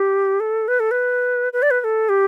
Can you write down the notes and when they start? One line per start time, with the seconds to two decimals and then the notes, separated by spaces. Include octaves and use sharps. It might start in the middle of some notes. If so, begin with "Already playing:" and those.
Already playing: G4
0.40 A4
0.68 B4
0.80 A4
0.91 B4
1.53 B4
1.62 D5
1.71 B4
1.81 B4
1.84 A4
2.09 G4